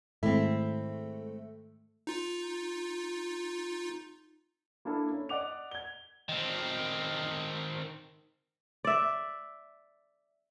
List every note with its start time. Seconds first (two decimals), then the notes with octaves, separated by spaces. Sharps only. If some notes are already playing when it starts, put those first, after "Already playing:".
0.23 G#2 D#3 G#3 A3 C4 E4 A4
2.07 D#4 F4
4.85 A#3 D4 E4 A4
5.10 C#4
5.29 D5 D#5 F#5 D6 F7
5.71 G#6 G7
6.29 D#3 C4
8.85 D5 E5